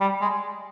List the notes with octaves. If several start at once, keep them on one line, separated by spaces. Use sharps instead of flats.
G3
G#3